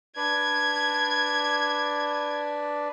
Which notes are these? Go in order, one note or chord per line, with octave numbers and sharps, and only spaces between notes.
D4 B4 D5 G#6